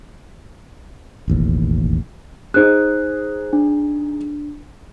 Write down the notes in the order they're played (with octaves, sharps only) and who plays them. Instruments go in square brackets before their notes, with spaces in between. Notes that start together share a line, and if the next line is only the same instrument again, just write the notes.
[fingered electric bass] E1 A1 D#2
[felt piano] D#4 G#4 [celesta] C5 F#6
[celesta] D4